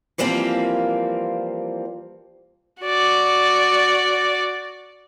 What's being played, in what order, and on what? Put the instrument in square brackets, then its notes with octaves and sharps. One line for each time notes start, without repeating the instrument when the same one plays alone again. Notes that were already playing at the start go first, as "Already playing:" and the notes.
[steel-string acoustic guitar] E3 F3 G3 A#3 C4 F4
[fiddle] F#4 D5